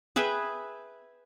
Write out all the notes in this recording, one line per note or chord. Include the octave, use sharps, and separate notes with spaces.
G#4 B4 E5 G5